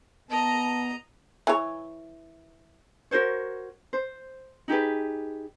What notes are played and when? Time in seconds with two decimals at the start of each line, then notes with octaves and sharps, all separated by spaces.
0.30 B3 D#5 A5 A#5
1.47 E3 C#5
3.11 F#4 A#4 C5 C#5
3.93 C5
4.68 D#4 G4 G#4 B4